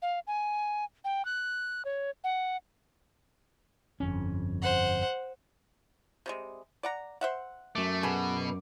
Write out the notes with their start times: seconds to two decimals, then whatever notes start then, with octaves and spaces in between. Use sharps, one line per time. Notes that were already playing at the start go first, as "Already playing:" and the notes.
0.02 F5
0.27 G#5
1.04 G5
1.25 F#6
1.85 C#5
2.24 F#5
4.00 G1 F2 C#4
4.62 C5 F#5
6.26 C3 G3 G#3
6.83 D5 F#5 A#5
7.21 C5 E5 F#5
7.75 F#2 A3 D6
8.03 B2 G#4 A4 B4